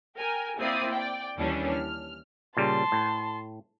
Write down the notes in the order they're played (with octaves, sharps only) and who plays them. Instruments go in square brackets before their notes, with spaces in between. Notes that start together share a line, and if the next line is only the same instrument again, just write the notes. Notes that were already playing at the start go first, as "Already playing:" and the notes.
[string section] A#4 G5 G#5
A#3 C4 E4 D5 D#6 C7
D5 G5
D#2 E3 G3 C#4 D4
F6
[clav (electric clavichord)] A#2 C#3 G3 [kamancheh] A5 C6
[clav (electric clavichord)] A2